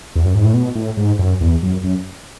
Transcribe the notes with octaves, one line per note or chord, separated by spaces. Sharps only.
E2
F#2
G#2
A2
B2
A2
G#2
F#2
E2
F#2
F#2